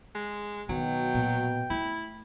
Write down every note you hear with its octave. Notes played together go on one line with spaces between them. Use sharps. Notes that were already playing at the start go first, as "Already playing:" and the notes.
G#3
B2 D#3 F#3 G5
A#2
A3 E4